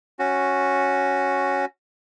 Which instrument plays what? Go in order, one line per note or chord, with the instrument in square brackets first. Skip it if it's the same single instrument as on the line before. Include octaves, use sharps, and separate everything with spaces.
[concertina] C#4 F#4